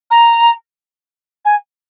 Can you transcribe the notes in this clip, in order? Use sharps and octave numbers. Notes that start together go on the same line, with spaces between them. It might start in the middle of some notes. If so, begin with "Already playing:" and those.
A#5
G#5